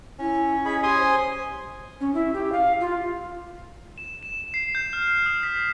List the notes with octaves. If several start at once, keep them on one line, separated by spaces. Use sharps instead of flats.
C#4 E4
G#4 D#5 B5
G4 G#5 C6 D#6
C5
C#4
E4
G4
F5
F4
E7
E7
C7
G6
F6
D#6
B6